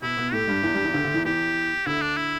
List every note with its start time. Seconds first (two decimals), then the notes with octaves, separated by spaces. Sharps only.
0.02 B2 B3 E4
0.17 B2 B3
0.32 A2 A3 G4
0.47 G2 G3
0.63 E2 E3
0.74 G2 G3
0.85 E2 E3
0.94 D2 D3
1.04 D2 D3
1.14 E2 E3
1.25 E2 E3 G4
1.86 D2 D3 E4
2.02 D4
2.17 E4